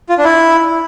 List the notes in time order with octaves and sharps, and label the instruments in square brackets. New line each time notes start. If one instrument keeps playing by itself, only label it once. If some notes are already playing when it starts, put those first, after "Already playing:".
[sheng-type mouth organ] F4
D4
E4